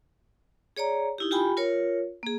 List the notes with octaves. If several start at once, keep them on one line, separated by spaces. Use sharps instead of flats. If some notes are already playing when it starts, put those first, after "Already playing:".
G#4 C#5 D5 A#5
D#4 E4 G4
F4 G4 G5 G#5 B5
F4 A#4 C#5
A#3 G#4